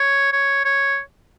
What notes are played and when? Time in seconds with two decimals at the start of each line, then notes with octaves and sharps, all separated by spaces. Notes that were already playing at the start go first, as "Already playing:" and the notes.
Already playing: C#5
0.33 C#5
0.65 C#5